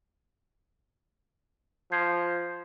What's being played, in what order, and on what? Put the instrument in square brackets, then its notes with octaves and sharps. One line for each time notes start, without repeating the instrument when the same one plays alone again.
[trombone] F3 [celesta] G6 G#6 C7